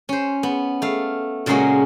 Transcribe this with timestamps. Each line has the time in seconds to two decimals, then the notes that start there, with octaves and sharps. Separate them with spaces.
0.09 C#4 C5
0.43 B3
0.82 A3 F5
1.46 A#2 C#3 G#3 A#3 C#4 F#4